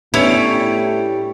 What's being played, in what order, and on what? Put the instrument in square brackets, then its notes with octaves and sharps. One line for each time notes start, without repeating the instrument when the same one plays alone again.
[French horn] A2 [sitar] G3 D4 C#5 [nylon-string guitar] B3 C#4 [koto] E4